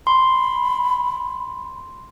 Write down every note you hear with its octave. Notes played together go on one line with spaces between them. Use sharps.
B5 C6